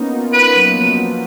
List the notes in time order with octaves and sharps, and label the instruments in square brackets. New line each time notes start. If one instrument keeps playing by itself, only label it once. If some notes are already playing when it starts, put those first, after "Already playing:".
Already playing: [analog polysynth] A#3 B3 C#4 D#4
F4
[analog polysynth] A#3 [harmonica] B4
[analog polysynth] F#3
F3
F#3